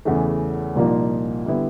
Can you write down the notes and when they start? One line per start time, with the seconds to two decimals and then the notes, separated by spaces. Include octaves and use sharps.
0.05 E2 C#3 E3 A3
0.76 C2 A#2 F3 A#3 D#4
1.46 D3 G3 B3 E4